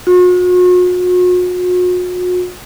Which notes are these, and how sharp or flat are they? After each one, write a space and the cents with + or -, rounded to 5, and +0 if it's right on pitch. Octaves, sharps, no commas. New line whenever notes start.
F#4 -40